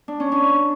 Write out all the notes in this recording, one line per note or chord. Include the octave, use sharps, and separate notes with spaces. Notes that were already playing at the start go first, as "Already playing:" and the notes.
D4
C#4
D4